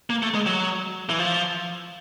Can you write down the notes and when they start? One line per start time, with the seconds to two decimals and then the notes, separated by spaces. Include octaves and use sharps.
0.10 A#3
0.22 A3
0.34 G#3
0.47 F#3
1.09 E3
1.19 F3